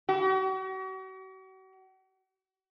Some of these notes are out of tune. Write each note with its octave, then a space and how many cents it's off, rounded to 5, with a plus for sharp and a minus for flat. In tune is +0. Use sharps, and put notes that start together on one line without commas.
F#4 +40